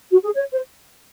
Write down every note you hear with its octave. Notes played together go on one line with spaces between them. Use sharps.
F#4
G#4
C#5
C5